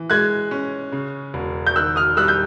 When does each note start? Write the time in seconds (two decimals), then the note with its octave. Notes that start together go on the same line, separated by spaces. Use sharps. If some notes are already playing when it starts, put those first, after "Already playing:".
Already playing: E3
0.10 G#3 F#6 G#6
0.51 C#4
0.92 C#3
1.34 E1
1.67 G6
1.76 D#3 E6 F#6
1.96 D#6 F6
2.17 G3 E6 F#6
2.28 G6